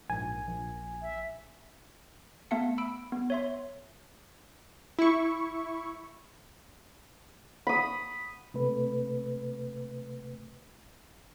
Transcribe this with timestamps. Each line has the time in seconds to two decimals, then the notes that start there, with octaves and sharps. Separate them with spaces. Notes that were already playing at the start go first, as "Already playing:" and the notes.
0.10 A#1 G#2 G#5
0.48 A#1
1.01 E5
2.51 A3 B3 E5 F5 A5 C#7
2.78 B5 E6 D7
3.12 B3
3.30 C#5 E5 C6
4.99 E4 C#6
7.67 B5 D#6
8.54 C3 A3 B4